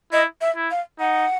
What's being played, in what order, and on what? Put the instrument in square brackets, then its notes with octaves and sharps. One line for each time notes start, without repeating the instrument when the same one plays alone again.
[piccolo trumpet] E4 [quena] D#5
[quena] E5
[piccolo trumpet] E4
[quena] F5
[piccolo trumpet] D#4 [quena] F#5